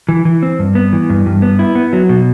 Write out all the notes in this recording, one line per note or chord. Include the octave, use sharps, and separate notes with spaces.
E3
E3
C4
G2
B3
E3
G2
G2
B3
E4
B3
F#3
B2